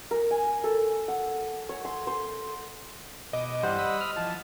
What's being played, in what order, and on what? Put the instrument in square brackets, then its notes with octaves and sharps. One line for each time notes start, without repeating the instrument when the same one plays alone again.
[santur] A#4
G#5
A4
F#5
C#5
C6
C5
[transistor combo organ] B2 D6 [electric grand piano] D#5
[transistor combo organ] G2 E3 [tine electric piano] G3 C5 [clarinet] F#5
[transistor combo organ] B5 D#6 E6
[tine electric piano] F6
[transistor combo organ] E3 F3 [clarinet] A5